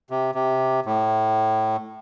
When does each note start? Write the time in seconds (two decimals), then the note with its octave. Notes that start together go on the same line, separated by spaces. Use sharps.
0.10 C3
0.35 C3
0.86 A2